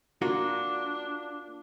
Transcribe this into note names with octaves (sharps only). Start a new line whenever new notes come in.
A#3 D4 F4 F#4